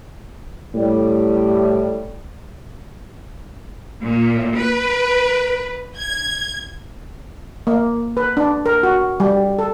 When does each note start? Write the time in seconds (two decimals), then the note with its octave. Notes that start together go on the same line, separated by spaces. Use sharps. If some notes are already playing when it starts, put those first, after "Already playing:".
0.75 A2 G3
4.02 A#2
4.57 B4
5.98 G#6
7.67 A#3
8.17 B4
8.37 D4
8.66 A#4
8.83 F#4
9.20 G3
9.59 A4